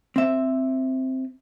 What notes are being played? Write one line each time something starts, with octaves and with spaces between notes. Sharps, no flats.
C4 E5